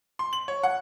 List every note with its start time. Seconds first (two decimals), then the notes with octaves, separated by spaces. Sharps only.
0.19 C6
0.33 F#7
0.48 C#5
0.63 F#5